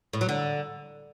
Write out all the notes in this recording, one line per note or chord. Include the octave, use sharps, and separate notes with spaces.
A2
F#3
D3